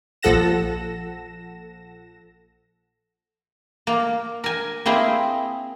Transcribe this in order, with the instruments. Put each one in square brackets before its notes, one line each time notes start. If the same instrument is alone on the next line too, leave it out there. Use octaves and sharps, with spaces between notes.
[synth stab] A#1 F3 A4 F#5 A#6 E7
[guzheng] A#3
A#4 G#5
A#3 C4 E4 G#4